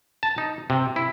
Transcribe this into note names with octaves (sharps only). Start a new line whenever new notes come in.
A5
D#4
C3
E4